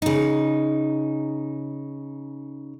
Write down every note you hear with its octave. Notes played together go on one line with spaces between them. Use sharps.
C#3 D#4